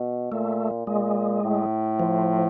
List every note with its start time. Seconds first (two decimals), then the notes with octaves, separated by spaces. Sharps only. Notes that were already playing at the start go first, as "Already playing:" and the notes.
Already playing: B2
0.32 A#2 A3
0.87 A#2 G#3
1.43 A2
1.99 F3